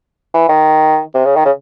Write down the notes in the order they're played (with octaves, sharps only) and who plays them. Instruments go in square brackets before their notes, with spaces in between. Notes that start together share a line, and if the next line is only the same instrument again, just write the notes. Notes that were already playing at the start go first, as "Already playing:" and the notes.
[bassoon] E3
D#3
C3
C#3
D#3
C#3